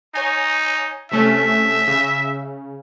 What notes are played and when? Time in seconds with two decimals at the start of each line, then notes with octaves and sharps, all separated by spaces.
0.15 D#4 C#5 G#5
1.11 C3 A3 C#4 E5
1.87 C#3